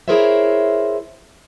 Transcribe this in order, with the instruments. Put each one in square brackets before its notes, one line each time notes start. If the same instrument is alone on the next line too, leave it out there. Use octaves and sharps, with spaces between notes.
[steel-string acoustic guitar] E4 G#4 A#4 C5 C#5 E5